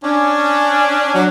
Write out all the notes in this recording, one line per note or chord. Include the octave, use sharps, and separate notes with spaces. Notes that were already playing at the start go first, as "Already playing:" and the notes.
C#4 D4
F#3